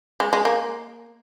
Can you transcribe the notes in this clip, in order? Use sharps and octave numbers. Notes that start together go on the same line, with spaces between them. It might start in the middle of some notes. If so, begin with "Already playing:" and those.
G#3
G#3
A#3